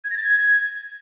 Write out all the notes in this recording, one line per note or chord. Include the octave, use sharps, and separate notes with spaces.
G#6
A#6
A6
G#6